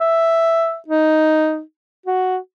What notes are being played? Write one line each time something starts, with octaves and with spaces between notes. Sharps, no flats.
E5
D#4
F#4